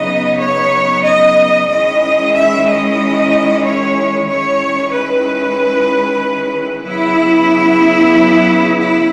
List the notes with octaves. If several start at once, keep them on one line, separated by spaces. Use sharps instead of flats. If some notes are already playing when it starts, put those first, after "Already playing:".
Already playing: C#3 F#3 B3 D#4 D#5
C#5
D#5
D#3 G#3 C#4 E4 D#5
E5
D#5
C#5
D#3 G#3 C#4 E4 C#5
B4
C#3 F#3 B3 E4
E4